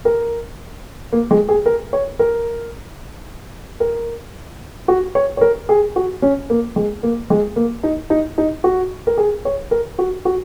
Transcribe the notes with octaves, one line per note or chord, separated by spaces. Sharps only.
A#4
A#3
G#3
G#4
A#4
C#5
A#4
A#4
F#4
C#5
C#5
A#4
G#4
F#4
C#4
A#3
G#3
A#3
G#3
A#3
D#4
D#4
D#4
F#4
A#4
G#4
C#5
A#4
F#4
F#4